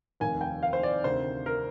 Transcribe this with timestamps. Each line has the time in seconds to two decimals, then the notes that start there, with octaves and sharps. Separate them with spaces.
0.20 F1 D#2 D#3 G#5
0.41 G5
0.63 F5
0.73 C5
0.83 D5
1.04 D2 C3 D#3 C5
1.46 A#4